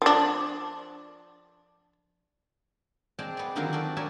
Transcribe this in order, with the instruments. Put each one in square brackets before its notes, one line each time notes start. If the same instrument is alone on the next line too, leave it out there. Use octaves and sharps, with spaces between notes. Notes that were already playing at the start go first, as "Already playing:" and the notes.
[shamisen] F3 D4
[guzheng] G#3 C4 D5 G5 A5
B3 D5
D3 D#3 F#3 C4 F4 C5
C4 F#4 G4 A4 D5
A#4 C#5 D5 E5 G#5 A5